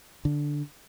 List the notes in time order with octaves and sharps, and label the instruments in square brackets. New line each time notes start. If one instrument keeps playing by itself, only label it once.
[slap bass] D3